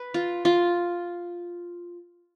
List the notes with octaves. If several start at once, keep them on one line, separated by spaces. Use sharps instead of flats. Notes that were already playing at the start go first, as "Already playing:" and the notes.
Already playing: B4
F4
F4